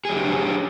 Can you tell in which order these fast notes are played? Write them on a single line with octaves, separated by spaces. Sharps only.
G#4 F#3 G4 D4